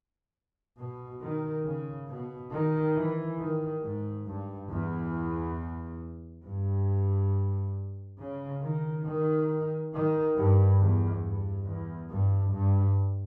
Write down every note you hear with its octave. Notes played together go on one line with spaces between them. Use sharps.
B2
D#3
C#3
B2
D#3
E3
D#3
G#2
G2
E2
G2
C#3
D#3
D#3
D#3
G2
E2
G2
E2
G2
G2